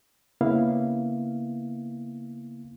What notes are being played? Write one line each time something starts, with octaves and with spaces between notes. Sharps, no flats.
C#3 A#3 B3 E4 F5